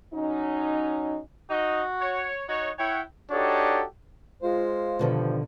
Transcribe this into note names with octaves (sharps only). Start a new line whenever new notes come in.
F#3 C#4 D#4
D#4 F#4 D#5
C#5
D#4 F#4 C#5
E4 C#5 F#5 G5
D4 D#4 F#4 G4 A4 C#5
G#3 F4 C5
G2 B2 D3 D#3 F3